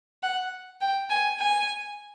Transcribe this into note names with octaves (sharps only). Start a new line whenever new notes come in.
F#5
G5
G#5
G#5